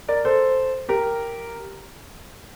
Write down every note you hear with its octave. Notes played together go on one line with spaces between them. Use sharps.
A#4 D5
A4 C5
G4 A#4